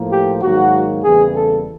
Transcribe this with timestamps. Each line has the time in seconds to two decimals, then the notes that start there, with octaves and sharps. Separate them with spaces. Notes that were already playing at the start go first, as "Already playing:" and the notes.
Already playing: A2 F3 A#3
0.12 G4
0.42 G#2 D#3 F#3 A#3 F#4
1.04 E2 C#3 E3 G3 A#3 G#4
1.35 A4